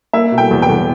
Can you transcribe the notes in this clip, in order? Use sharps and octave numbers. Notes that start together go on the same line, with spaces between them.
A#3 E5
B2
G5
E2
G5
E2